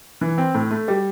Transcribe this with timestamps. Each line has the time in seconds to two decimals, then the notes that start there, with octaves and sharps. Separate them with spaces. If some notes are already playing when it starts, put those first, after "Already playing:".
0.21 E3
0.38 C4
0.54 A2
0.71 A3
0.88 G3